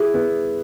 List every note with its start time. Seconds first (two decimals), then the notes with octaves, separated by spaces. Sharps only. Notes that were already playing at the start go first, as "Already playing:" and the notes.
Already playing: E4 G#4
0.14 B3